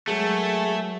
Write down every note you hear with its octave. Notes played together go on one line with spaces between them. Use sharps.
F#3 G#3 A3 G#4 A#4